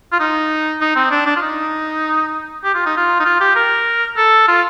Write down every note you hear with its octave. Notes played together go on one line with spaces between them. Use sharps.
F4
D#4
D#4
C4
D4
D4
F4
D#4
G4
F4
D#4
F4
D#4
F4
G4
A#4
A4
F4